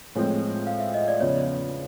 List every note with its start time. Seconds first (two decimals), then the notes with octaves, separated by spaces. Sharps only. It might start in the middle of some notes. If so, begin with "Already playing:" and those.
0.15 A2 F3 G#3 C4 C#5
0.67 F5
0.80 E5
0.94 D#5
1.08 D5
1.20 E2 C#3 F3 C#5